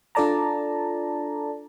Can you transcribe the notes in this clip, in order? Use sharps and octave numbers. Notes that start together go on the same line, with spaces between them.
D4 F4 A4 D5 A5 A#5